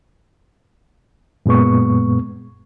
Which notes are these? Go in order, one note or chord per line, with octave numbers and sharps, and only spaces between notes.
F#2 A#2 G#3 B3 C#6